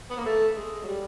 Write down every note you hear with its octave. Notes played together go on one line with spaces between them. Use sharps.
B3
A#3
A3
G#3
F#3
G3